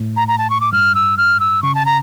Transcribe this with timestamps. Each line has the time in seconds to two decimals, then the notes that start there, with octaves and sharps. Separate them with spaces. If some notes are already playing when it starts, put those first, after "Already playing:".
Already playing: A2
0.16 A#5
0.28 A#5
0.38 A5
0.50 C#6
0.61 D6
0.72 G2 F6
0.95 E6
1.17 F6
1.40 E6
1.63 C#3 C#6
1.75 A5
1.86 A#5